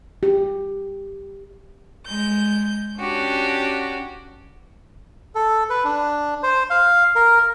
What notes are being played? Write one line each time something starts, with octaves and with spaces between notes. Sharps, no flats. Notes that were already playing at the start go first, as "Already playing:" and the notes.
G4
G#3 G6
C#4 D4 F#4 G4
A4
B4
D4
C5
F5
A#4